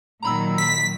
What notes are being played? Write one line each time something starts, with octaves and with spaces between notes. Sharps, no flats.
A#2 D#3 F#3 A#5 B5 E6
B6